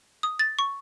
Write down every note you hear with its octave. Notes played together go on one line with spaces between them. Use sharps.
D#6
A6
C#6